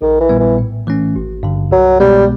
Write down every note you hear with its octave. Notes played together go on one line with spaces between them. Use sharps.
A#1 D#3
E3
A#2 G3 B3
E3
A2
E3 A3 C#4
G#1
G2 D3
C2 F#3
B2 G3 G#3 B3